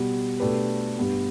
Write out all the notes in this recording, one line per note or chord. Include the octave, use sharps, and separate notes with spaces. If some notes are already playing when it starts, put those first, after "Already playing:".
Already playing: B2 G3 B3
B2 A3 D4 G4 B4
G2 G3 B3 G4